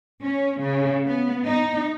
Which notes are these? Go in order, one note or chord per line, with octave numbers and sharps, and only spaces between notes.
C#4
C#3
B3
D#4